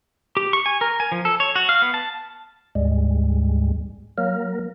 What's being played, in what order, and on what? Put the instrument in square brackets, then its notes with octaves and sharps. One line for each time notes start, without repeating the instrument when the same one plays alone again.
[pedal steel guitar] G4
C#6
G#5
A#4
G#5
F3
A4
C#5
F#4
F5
B3
A5
[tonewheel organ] D2 G#2 G3 G#3
F#3 A#3 A#4